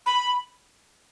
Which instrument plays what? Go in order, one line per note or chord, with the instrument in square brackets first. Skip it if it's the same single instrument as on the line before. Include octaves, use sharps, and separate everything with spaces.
[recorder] B5